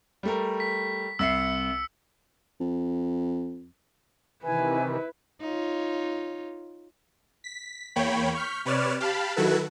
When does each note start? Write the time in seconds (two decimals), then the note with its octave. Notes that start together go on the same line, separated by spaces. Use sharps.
0.23 G3 A3 A#4
0.60 B6
1.19 C2 E5 E6 C7 C#7
2.60 F2
4.44 C3 D#3 E3 E4 B4 G#5
5.41 D#4 F4 C#5
7.44 B6
7.96 E2 A#3 C#5 G5 B5
8.35 C#6 F6 G6 B6
8.65 C3 B4 C#5 D5 F6 E7
9.00 G4 F5 A5 B5
9.36 D#3 F#3 E4 F#4 A4 B4